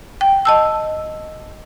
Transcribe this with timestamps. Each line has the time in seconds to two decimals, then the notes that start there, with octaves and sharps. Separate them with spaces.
0.21 G5
0.45 D#5 A5 E6